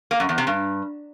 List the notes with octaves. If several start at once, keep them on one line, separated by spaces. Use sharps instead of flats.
A#3
F#2
E2
C3
G2